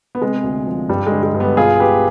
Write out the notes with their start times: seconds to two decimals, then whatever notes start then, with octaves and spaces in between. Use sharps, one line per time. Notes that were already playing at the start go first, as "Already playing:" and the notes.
0.15 B3
0.21 C3 G#3
0.44 D2
0.66 F3
0.89 G2 G3
1.06 G#3
1.12 D3
1.23 G#3
1.34 G2
1.40 G3 B3
1.57 B1 F4 G#4
1.80 B2 G4 B4